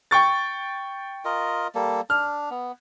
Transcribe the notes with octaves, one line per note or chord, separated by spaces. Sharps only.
G5 C#6 A6
F4 A#4 D#5
G3 A#3 A4
D4 F6
B3